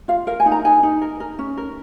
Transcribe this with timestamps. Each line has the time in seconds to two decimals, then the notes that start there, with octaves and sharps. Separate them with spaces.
0.08 F4 F5
0.27 A#4 F5
0.40 G#5
0.46 D#4
0.52 A#5
0.65 D#4 G#5
0.83 D#4
1.02 A#4
1.20 A#4
1.39 C#4
1.57 A#4